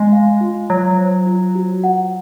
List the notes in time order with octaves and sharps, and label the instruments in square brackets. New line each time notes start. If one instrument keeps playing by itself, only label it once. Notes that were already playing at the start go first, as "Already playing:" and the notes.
Already playing: [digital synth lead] G#3 [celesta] G#5
[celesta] F5
F4
[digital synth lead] F#3 [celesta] F4
[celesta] C5
F4
F#4
F#5